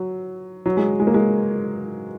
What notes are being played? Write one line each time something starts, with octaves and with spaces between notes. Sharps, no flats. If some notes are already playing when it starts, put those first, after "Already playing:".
Already playing: F#3
F#3
G#3
G#3
A#3
G#3